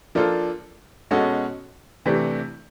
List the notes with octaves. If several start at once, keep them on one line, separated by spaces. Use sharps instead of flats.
F3 A#3 D4 F4 A4
B2 G#3 C#4 F#4 A4
C3 E3 A3 D4